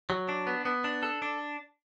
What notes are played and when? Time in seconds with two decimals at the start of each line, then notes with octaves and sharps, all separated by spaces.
0.10 F#3
0.29 D4
0.47 B3
0.65 B3
0.84 D4
1.03 A4
1.22 D4